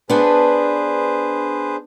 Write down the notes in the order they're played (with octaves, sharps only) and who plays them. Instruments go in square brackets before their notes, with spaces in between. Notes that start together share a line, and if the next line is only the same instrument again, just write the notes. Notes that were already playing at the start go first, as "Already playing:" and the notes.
[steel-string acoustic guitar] B3 D4 [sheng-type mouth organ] G#4 B4 C5